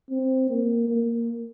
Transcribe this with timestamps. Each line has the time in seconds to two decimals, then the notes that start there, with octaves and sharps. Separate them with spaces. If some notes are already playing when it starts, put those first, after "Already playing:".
0.10 C4
0.50 A#3
0.89 A#3